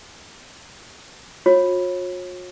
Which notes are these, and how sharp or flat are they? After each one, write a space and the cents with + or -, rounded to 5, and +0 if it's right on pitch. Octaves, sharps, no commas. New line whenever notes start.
F#4 -45 C#5 -35